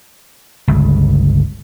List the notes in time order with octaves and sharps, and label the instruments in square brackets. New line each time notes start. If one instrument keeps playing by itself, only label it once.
[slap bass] G1 C#2